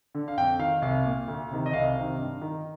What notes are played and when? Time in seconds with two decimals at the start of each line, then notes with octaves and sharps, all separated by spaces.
0.15 D3
0.28 F5
0.38 F2 G5
0.59 D#3 F5
0.82 C2 F5
1.06 A#2
1.28 D2
1.51 C3 D#3
1.66 D#5
1.73 C2 F5
1.96 C3 D#3
2.18 G2
2.42 D#3